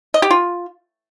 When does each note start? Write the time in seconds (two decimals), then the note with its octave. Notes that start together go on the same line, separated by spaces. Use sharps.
0.14 D#5
0.22 G4
0.31 F4